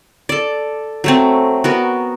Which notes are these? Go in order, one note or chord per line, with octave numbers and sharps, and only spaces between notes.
A4 D5
F#3 A3 C4
B3 F#4 A#4